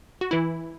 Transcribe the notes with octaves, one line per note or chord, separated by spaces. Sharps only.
F#4
E3 E4